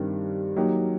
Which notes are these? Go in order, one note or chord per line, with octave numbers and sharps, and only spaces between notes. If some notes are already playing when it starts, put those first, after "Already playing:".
Already playing: G2 D#3 G3 C4
F#3 A#3 D#4 G4